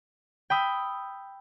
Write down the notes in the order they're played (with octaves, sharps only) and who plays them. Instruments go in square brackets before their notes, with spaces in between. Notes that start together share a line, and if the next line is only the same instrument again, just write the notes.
[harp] G5 B5 D#6 E6